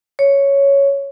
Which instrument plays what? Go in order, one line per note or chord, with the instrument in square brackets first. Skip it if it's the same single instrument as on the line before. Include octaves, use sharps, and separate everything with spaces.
[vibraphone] C#5